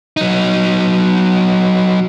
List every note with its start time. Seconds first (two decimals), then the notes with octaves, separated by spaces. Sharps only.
0.17 F#3 D#4